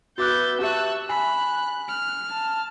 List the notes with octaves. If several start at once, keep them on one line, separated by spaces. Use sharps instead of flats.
B3 F#4 E5 D6 F#6 G6 A6
G4 E5 A5 C#6 E6 F#6
G#5 B5 F#6
F6
A5